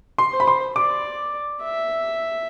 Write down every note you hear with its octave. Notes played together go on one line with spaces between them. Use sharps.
C6
C5
B5
C6
D5 D6
E5